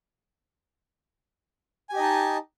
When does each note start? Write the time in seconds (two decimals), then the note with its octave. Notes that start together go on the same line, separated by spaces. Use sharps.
1.89 G#5
1.93 G4
1.96 D#5
1.99 D#4
2.03 A5